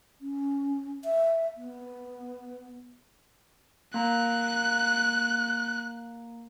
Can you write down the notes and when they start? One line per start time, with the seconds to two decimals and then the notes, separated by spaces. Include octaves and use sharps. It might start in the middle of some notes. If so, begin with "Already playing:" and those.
0.21 C#4
1.04 E5
1.57 B3
3.94 A#3 A#5 F#6